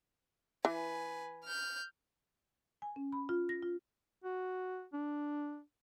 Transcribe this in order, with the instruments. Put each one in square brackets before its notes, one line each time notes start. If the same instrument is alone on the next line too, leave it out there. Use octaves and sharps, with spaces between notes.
[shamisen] E3 [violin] B4 G#5
[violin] F6 G6
[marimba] G#5
C#4
B5
F4
A#6
F4
[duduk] F#4
D4